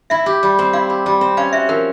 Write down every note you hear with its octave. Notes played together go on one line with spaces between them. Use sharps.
E4 E5
G4
G3
C4
E4 F5
G4
G3
C4
C#4 F5
F#4 E5
F3 A#4